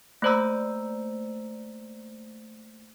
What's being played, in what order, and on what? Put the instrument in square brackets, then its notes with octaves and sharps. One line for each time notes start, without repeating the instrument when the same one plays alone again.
[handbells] A3 A#3 C5 D5 A#5 E6